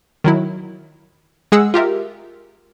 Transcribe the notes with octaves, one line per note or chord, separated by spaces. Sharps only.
D#3 F#3 E4
G#3 G#4 F#5 E6
F4 G4 A#4 E5